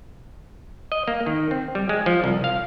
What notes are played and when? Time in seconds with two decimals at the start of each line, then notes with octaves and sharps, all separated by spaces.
0.92 D#5
1.08 A#3
1.26 D#3
1.51 C4
1.75 G3
1.89 G#3
2.06 F3
2.24 C2
2.44 F5